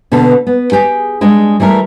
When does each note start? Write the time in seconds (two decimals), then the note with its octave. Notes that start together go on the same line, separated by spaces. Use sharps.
0.12 B2 D3 B3 A4
0.47 B3
0.72 G4 G#4
1.21 G3 G#3 D4
1.60 E3 G3 A3 A#4